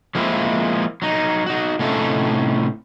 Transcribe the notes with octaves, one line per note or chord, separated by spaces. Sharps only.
F3 G#3 A#3 C4 E4
F#3 D#4
D#4 F#4
A2 C3 C#4 D#4 F4 A4